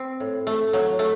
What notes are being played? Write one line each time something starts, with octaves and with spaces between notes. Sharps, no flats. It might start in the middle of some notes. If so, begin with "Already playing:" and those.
Already playing: C4
A2
A3
F#3
A3